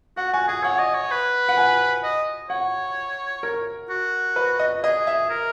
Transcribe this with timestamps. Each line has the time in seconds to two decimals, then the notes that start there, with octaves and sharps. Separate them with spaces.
0.17 F#4 F#5
0.33 F#4 G#5
0.48 G#4 G#5
0.64 C#5 F#5
0.79 D#5
0.95 C#5
1.11 B4
1.49 F#5
1.57 G#5
2.04 D#5
2.50 C#5 F#5
3.43 A#4
3.90 F#4
4.36 B4
4.59 D#5
4.83 G#4 D#5
5.07 E5
5.30 A#4